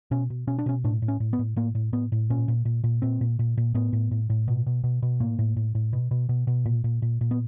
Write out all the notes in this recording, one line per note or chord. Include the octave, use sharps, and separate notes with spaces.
B2 C#4
B2
B2 C#4
D4
B2 C#4
A2 D4
A2
C#4
A2
B3
A2
A2 A#3
A2
A2 B3
A2
A#2 C#4
A#2
A#2
A#2
A#2 C4
A#2
A#2
A#2
A2 B3
A2
A2
A2
B2
B2
B2
B2
A2 A#3
A2
A2
A2
B2
B2
B2
B2
A#2
A#2
A#2
A#2
B3